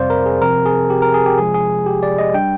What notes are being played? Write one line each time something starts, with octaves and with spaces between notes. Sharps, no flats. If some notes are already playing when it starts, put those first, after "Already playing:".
Already playing: F2 C3 G3 C4 C5 D5 F5
A#4
G#4
C3 F3 C4 A#4
G#4
G4
A#4
G#4
G4
C3 F3 G#3 G#4
G#4
G4
D5
D#5
G3 D4 G5